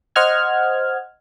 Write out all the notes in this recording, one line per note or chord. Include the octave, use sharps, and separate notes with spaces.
C5 D#5 F#5 F6 G#6